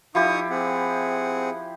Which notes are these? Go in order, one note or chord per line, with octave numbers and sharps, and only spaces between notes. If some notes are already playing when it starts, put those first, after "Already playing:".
F3 D#4 E4 G4 C#6 D#6
C4 G#4 F#5